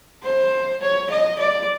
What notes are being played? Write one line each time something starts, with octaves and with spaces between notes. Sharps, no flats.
C5
C#5
D#5
D5